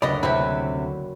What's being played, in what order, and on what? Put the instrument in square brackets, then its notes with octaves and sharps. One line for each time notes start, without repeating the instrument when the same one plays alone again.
[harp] F#1 B6 [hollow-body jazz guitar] D2 D3 D5 [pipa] B3 D#5
[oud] C3 E4 [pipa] C4 B4
[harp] F#4